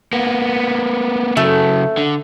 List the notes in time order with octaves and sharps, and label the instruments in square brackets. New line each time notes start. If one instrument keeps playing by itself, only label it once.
[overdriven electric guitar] A#3 B3
[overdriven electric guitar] C#3 F#3 [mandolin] A3
[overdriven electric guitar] D3